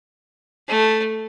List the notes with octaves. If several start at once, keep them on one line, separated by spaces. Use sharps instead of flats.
A3